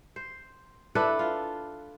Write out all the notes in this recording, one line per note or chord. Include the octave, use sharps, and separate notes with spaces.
C5
D4 E4 A4 B4
F4